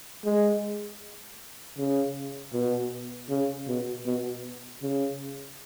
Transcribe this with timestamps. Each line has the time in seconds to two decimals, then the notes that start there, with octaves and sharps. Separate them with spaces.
0.25 G#3
1.78 C#3
2.54 B2
3.30 C#3
3.68 B2
4.06 B2
4.83 C#3